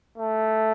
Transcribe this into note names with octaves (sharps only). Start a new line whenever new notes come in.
A3